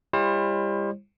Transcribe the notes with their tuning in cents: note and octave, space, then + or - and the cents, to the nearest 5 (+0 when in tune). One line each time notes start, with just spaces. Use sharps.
G3 +35 E4 +30 C5 +35